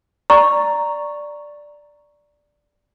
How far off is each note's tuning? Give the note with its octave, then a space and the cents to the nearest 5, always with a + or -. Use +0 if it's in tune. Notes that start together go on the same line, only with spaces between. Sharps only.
D5 +0 A#5 +0 C#6 +0